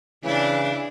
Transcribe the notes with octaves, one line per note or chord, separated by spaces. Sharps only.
C#3 E3 D4 E4